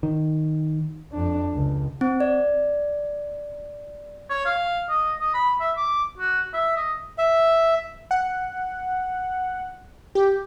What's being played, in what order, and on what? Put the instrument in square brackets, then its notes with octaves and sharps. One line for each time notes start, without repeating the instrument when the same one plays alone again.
[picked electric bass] D#3
[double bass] F2 D4
C#2
[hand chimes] C4
D5
[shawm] C#5
F5
D#5
D#5
B5
E5
D6
F#4
E5
D#5
[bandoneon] E5
[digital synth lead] F#5
G4